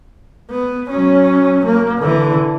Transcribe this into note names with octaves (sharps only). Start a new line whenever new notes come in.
B3
F#3 C#4
A#3
D3 E3